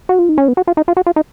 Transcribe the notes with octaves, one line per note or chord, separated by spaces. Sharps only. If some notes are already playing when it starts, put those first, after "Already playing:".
F#4
F4
D#4
C#4
B3
F#4
F4
D#4
F4
F#4
F4
D#4